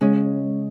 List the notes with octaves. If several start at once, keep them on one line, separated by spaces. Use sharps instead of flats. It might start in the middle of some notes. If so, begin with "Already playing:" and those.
C#3 G#3 C#4